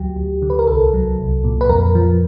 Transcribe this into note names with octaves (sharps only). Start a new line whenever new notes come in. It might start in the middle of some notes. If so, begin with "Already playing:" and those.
Already playing: D2 F#3 G4
D2
D3
B4
A#4
C2 A4
F#3
C2
A#2
B4
F2 A#4
F3